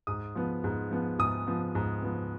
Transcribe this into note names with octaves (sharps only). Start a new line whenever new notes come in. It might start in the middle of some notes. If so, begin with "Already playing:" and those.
G#2 D#6
F3 B3
G#2
F3 B3
G#2 D#6
F3 B3
G#2
F3 B3